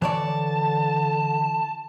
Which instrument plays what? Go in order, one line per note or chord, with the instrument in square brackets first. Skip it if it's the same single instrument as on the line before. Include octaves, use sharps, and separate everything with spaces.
[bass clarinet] D3 [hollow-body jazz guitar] E3 C#5 D5 [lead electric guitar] A5